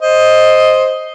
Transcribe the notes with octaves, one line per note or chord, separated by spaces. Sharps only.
C5 D#5